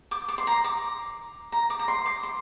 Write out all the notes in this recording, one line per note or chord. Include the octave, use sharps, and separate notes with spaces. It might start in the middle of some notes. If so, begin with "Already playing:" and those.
D6
D6
C6
A#5
D6
A#5
D6
A#5
C6
D6
C6